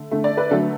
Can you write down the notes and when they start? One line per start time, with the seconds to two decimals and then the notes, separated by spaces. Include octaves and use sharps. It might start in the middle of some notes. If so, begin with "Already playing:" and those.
Already playing: D3 A3
0.11 D3 A3
0.24 D5
0.37 B4
0.51 D3 F#3 A3 A4